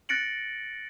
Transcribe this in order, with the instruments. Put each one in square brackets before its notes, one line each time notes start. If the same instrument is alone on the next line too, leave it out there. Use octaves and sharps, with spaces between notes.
[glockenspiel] F#6 A6 A#6 C#7 D7 F#7